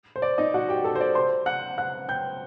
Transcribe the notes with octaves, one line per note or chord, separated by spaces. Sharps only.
C5
D5
D#4 D#5
F#4 F#5
G4 G5
A4 A5
C5
D5
C5 C6
F#5 F#6
F#5 F#6
G5 G6